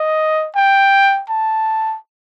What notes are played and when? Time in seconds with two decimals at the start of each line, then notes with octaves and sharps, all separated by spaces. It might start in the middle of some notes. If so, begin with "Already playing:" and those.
Already playing: D#5
0.56 G5
1.30 A5